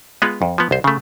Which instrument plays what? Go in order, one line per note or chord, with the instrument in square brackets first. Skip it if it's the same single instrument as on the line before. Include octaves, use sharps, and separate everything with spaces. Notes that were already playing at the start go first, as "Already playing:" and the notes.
[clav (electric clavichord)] G#3 B3 F4 B4
F2
F3 B3
C2 C5
C#3 A3